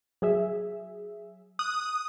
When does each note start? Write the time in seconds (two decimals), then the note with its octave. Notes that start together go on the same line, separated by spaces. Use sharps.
0.22 F#3 G#4 E5
1.59 D#6 F#6